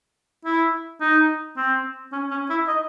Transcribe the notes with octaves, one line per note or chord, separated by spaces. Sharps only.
E4
D#4
C4
C#4
C#4
E4
D#5